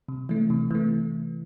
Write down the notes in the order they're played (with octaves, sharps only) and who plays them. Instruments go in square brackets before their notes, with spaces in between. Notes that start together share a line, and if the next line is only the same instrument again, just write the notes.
[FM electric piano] C3
E3 A3
C3
E3 A3